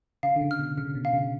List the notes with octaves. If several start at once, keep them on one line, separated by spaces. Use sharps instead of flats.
C#3 F5
D3
C#3
F6
B2
C#3 F6
B2
F5
C#3